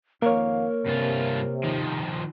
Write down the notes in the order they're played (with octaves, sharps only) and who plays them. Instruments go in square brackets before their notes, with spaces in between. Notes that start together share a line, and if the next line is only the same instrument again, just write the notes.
[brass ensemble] F2 D#3 F5 [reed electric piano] A#3 C#5 [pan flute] A#4
[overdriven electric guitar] G2 F4 [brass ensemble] C3
[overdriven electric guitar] D#3 F3